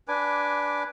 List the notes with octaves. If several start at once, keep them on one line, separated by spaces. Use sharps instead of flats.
D4 B4 G#5 D6